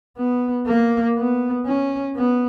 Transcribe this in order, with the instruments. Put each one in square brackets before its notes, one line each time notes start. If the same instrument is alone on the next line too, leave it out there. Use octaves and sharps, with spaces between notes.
[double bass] B3
A#3
B3
C#4
B3